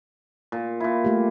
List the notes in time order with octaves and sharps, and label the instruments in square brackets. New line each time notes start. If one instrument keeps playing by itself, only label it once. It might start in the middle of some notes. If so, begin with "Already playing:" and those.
[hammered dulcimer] A#2
A#2 E4
[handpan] A3 G4